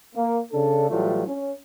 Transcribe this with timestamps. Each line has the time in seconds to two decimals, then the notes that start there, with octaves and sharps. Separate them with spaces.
0.15 A#3
0.53 C#3 D4 A4
0.90 A2 E3 F#3 G3 A3 F4
1.27 C#4